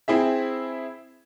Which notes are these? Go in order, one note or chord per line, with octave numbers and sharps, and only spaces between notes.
C4 E4 G#4 E5